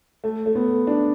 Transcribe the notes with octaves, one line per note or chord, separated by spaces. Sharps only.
A3
A3
B3
D4